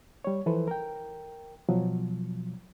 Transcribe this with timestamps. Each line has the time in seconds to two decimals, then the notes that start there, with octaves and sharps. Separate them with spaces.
0.25 G3 C#5
0.46 E3 F3 A4 B4 C5
0.68 A#4 G5
1.69 B2 F3 F#3